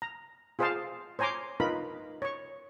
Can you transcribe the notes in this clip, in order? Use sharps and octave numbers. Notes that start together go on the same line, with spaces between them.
A#5
F4 G#4 C5 D#5 F5 A5
C5 C#5 G#5 A#5 C6 D6
D#4 F4 A#4 B4 B5
C#5 C#6